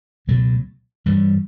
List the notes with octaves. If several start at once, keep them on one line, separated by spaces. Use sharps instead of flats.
C#2 B2 F#3 A3
G2 E3 G3